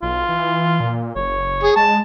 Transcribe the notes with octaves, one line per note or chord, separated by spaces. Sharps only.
B1 F4
E3
A#2
F#1 C#5
G#4
G#3 A5